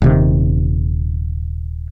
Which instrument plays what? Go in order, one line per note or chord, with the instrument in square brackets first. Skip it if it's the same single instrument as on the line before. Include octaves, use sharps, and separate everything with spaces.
[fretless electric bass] D#1 C3 D#3